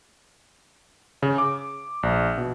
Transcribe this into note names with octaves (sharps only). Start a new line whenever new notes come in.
C#3
D6
A#1
B2